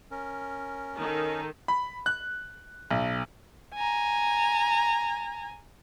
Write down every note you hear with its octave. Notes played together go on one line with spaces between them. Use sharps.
C#4 A#4
D#3 D#4 A4
B5
F#6
B1
G#5 A#5